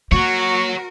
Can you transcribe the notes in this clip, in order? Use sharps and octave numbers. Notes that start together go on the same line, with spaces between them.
A#3 F#4 A#4 C#5 F#5 C#6